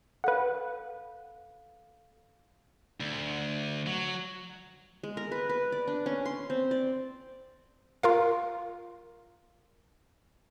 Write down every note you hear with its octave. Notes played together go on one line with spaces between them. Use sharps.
A4 B4 F5 F#5
D2
F#3
G#3
A#4
B4
B4
D5
D4
C#4
C6
C4
D5
F4 A#4 F5